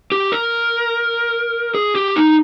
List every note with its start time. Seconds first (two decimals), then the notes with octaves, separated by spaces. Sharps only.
0.12 G4
0.32 A#4
1.75 G#4
1.95 G4
2.16 D#4